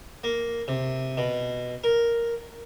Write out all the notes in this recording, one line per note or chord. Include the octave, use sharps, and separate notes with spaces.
A#3
C3
B2
A#4